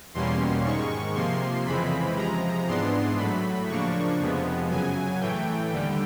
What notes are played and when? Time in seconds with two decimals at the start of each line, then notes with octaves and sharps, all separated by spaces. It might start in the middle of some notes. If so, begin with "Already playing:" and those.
0.14 E2 B2 G3 A#3 C#4 C6
0.65 G#2 D#3 G#3 C#6
1.15 C3 F3 A#3 C6
1.66 F2 C#3 E3 G#3 C4 B5
2.17 C3 F3 G#3 A#5
2.67 G#2 E3 G#3 B3 D4 C6
3.18 A2 F#3 A3 B5
3.69 C#3 F3 A#3 D4 C#6
4.20 F2 C3 F3 G#3 B3
4.70 F#2 C#3 F#3 G#5
5.21 A2 E3 A3 G5
5.71 D#2 D3 G3